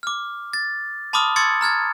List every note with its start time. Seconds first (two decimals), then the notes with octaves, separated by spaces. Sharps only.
0.03 D6 F6
0.53 A6
1.13 A5 B5 C6 D6 D#6 F6
1.36 C6 D6 E6 G#6 A6 C#7
1.61 A#5 F6 G#6 A6